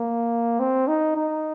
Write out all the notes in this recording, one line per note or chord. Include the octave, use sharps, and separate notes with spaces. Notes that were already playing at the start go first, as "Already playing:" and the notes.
Already playing: A#3
C4
D#4
D#4